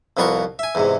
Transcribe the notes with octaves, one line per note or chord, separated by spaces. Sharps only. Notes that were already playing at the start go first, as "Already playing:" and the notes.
C2 F2 B3 F4 A#5 C#6
E5 G#5
E2 G#2 C3